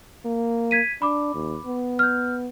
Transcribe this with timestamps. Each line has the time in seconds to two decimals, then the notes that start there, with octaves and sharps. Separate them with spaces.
0.25 A#3
0.71 G#6 B6 D#7
1.02 D4 B5 D6
1.34 D#2
1.66 B3
1.99 F6 G6